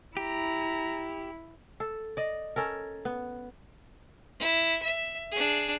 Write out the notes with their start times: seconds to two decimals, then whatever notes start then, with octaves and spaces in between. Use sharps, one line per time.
0.17 E4 G4 A#5
1.80 A4
2.17 D5 D#5
2.56 C#4 A4 A#4
3.05 B3
4.40 E4
4.83 E5
5.31 D4 G#4